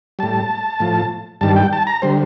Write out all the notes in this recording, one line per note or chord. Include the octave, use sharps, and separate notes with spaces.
A2 G3 A5
A2 F3
G2 D#3 G3 A5
G5
A5
A#5
D3 G3 C5